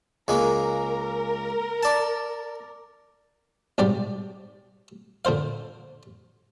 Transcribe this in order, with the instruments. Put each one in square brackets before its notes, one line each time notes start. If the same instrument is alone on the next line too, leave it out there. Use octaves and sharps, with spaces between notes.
[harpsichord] C#2 G#3 A#3 [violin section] A#4
[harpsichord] D5 A5
B1 G#2 G3 G4 D5
A#2 D3 C5 F5